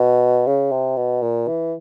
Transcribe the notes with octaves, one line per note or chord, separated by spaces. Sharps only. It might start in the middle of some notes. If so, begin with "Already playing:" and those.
Already playing: B2
C#3
C3
B2
A#2
E3